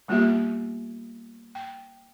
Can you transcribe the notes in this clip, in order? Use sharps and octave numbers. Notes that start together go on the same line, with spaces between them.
G3 A#3 B3 F4 G4 E5
G5